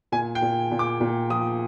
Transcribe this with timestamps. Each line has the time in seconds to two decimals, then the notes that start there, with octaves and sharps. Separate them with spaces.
0.12 A#2 G#5
0.35 G5
0.42 A#2
0.71 A#2
0.79 D6
1.01 A#2
1.30 F3 D#6